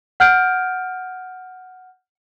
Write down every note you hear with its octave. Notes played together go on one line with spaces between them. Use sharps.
F#5 F6 G6 D7